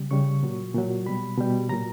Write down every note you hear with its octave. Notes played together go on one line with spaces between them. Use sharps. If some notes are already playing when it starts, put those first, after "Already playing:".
Already playing: C#3 G3
C#3 G3 C#6
A#2 F#3
A#2 F#3
B2 G3 B5
B2 G3
A#2 F#3 A#5